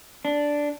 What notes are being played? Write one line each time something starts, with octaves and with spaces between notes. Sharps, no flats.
D4